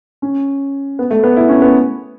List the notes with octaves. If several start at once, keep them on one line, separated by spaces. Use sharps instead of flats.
C#4
B3
A3
B3
E4
C#4
B3